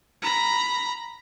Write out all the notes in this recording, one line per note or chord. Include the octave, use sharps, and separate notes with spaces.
A#5 B5